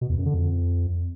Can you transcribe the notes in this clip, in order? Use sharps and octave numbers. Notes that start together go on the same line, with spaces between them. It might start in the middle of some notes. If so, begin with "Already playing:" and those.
B2
E2
F#2
D3
F2